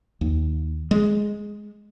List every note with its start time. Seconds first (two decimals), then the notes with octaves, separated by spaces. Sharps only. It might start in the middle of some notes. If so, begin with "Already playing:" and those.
0.21 D#2
0.91 G#3